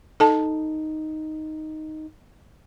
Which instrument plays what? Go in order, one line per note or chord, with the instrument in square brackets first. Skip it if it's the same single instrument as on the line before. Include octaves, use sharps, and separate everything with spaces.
[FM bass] D#4 [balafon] A4 A5